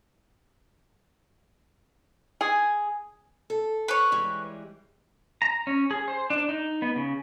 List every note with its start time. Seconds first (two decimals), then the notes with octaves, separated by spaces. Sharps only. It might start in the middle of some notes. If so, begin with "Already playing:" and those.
2.41 G#4
3.50 A4
3.88 B4 C#5
4.12 E3 G3 G#3
5.42 A#5
5.67 C#4
5.91 G#4
6.08 C5
6.30 D4
6.49 D#4
6.82 B3
6.96 C#3